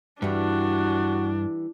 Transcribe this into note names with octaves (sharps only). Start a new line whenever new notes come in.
G2 E3 G3 D4 F#4